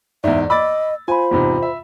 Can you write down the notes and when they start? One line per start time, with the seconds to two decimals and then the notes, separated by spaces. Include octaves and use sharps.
0.24 E2 G#2 D5 E5
0.50 D#5 B5 D6 E6 A6
1.08 F4 C5 G#5 B5
1.31 E2 G#2 C3 F4 B5
1.62 E5